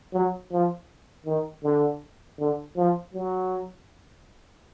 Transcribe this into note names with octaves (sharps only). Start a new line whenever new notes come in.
F#3
F3
D#3
D3
D3
F3
F#3